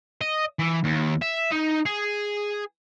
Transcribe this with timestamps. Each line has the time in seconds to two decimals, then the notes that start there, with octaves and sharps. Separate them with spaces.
0.21 D#5
0.59 E3
0.84 D#2
1.22 E5
1.51 D#4
1.86 G#4